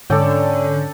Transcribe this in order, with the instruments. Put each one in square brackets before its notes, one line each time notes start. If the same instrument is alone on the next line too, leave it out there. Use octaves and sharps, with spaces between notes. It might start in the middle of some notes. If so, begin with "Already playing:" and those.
[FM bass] G#2 [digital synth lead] D3 [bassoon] C#4 [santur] A4 D5 G5